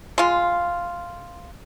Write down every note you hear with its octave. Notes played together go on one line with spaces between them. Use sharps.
G#3 F4